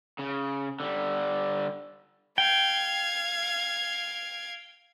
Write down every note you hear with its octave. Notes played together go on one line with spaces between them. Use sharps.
C#3
D3 G3
F5 G5 G#6